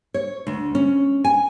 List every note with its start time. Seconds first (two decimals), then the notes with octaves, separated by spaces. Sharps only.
0.14 C#5
0.47 D2
0.75 C#4
1.24 G#5